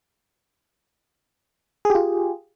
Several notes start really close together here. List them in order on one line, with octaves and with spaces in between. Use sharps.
G#4 G4 F4